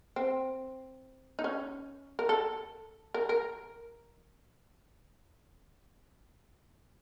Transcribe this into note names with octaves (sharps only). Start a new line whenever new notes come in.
C4
D#4
C#4
A#4
A4
A#4
A#4